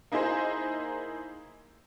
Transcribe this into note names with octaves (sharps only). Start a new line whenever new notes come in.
A#3 D#4 E4 G#4 C5